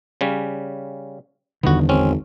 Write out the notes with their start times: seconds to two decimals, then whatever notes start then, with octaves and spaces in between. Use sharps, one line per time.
0.21 C#3 G3 C#4
1.63 G1 E2 D3 D#3 B3 F#4
1.89 G#1 C4 C#4